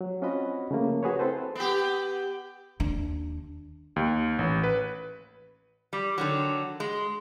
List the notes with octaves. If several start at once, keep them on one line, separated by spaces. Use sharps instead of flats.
F#3
C4 C#4 F4 F#4 D#5 B5
C#3 F3 A3 A#3
F#4 G#4 B4 C#5
C4 E4 A4 B4 C5
B3 G4
D#2 D4
D#2
A1
B4
G3
D3 D#3 F#3
G#3